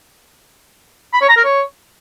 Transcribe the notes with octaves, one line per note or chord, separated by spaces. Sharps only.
B5
C#5
A#5
A#4
C#5